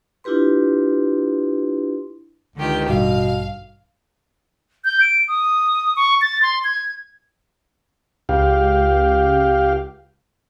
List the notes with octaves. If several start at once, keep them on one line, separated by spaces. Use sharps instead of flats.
D4 E4 F4 G4 B4 C6
C#2 D3 D#3 G4
A1 G2 B2 F5
G6
D7
D#6
C#6
A6
C6
G#6
C#2 G4 F5